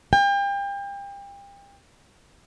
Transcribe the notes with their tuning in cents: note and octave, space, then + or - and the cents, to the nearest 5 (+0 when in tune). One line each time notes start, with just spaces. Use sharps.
G5 +35